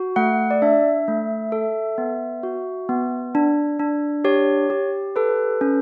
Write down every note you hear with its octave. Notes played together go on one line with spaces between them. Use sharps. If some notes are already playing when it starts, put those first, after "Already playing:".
Already playing: F#4
A3 F#5
D5
D4 E5
A3
A4
B3
F#4
B3
D4
D4
G4 C#5
G4
A4 B4
C#4